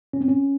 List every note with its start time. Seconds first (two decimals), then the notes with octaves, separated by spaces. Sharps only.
0.13 C#4
0.21 C4
0.28 C#4